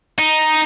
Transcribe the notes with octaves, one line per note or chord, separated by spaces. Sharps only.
D#4